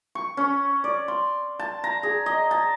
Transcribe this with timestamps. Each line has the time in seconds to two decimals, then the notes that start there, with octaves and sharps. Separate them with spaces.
0.15 C#6
0.37 C#4
0.84 D5
1.08 C6
1.59 A5
1.84 A#5
2.03 G#4
2.26 D#5
2.51 A5